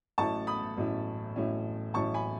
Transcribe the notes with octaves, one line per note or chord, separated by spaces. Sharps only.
A1 A2 F#3 C#4 E4 A5 C#6
B5 D#6
A1 A2 F#3 C#4 E4
A1 A2 F#3 C#4 E4
A1 A2 F#3 C#4 E4 A5 C#6
G#5 B5